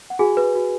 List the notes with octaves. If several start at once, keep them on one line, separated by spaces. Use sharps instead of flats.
F#5
F#4 G#4 G#5
B4
F#4